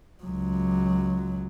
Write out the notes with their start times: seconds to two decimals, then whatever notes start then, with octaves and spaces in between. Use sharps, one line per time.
0.24 C#2 F#3